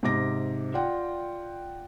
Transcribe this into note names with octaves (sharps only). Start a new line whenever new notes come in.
G#2 C3 D6 A#6
F4 D5 F#5 G5